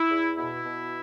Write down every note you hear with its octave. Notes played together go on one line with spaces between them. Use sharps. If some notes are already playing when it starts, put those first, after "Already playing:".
Already playing: E4
E2
B2 E4
B2